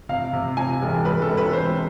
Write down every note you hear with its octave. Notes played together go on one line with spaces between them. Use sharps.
C3 F5
C3
C3 G#5
E1
E1 B4
A4
E1
B4
E1 C5